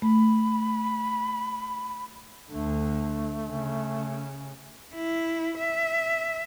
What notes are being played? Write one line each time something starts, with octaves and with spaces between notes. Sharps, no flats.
A3 B5
D2 D3 A3
C#3
E4
E5